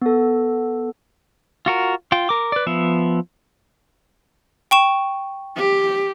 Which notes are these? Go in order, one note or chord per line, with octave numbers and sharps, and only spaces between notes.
B3 A4
F4 F#4 A#4
F4 G5
A#4 D6
B4 D5
F3 B3 E5
G5 C#6 E7
G4